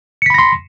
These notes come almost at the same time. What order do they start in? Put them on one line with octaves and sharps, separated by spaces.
C#7 B6 B5 A#6 C6